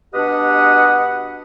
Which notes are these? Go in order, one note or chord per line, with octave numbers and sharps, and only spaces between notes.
B2 D4 G4 B4 D#5 F#5